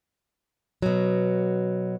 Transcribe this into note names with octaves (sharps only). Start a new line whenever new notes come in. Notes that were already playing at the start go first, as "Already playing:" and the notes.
B2 F#3